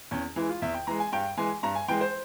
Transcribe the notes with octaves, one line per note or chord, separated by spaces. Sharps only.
E2 C#4
E3 G#3 E4
F4
E2 E5
G5
E3 G#3 A#5
G#5
G2 G5
E3 G#3 G#5
G2 A#5
G#5
E3 G#3 G5
C5